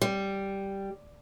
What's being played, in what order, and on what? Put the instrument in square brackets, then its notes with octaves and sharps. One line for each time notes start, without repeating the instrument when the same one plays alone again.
[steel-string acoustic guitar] G3